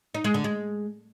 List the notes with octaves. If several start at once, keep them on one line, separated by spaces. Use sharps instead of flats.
D#4
G#3
D3
G#3